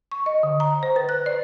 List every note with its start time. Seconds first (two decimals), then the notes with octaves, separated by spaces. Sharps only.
0.12 C#6
0.26 D#5
0.43 D3
0.60 A#5
0.83 C5
0.96 B4
1.09 F#6
1.26 D5